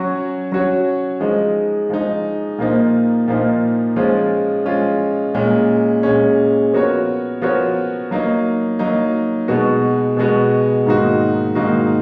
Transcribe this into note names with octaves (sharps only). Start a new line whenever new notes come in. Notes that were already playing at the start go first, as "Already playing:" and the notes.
Already playing: F#3 C#4 F#4 C#5
F#3 C#4 F#4 C#5
F3 G#3 D#4
F3 G#3 D#4
A#2 F3 A#3 D#4
A#2 F3 A#3 D#4
F3 G#3 C#4 F4
F3 G#3 C#4 F4
A#2 G#3 C#4
A#2 G#3 C#4
F3 B3 F#4 A#4 C#5
F3 B3 F#4 A#4 C#5
F#3 A#3 D#4
F#3 A#3 D#4
B2 G#3 B3 F#4
B2 G#3 B3 F#4
G#2 D#3 A#3 D#4 F#4
G#2 D#3 A#3 D#4 F#4